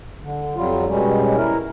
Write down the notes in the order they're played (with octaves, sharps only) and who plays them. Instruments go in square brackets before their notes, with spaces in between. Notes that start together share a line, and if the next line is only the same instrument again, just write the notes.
[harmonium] D3
F2 F#3 G3 F4
B2 G3 G#3 C#4
E4 A#4